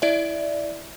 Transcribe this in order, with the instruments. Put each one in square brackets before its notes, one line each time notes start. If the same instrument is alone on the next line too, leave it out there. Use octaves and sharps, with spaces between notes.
[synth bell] E4 D5 E5